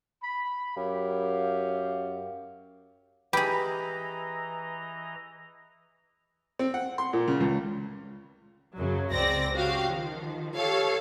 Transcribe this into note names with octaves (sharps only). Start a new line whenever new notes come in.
B5
F#2 G4 F5
E3 G4 G#4 B4 D#5 A#5 B5
C4
F#5
C6
A#2
C#3
C#2
F#2 C#3 F#3
C#2 C#3 C4 D5 A#6
C#3 F#4 G4 F5
D#3 F3
G4 A4 C#5 F5